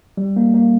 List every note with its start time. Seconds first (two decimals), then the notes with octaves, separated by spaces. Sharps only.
0.17 G3
0.36 A#3
0.54 A#3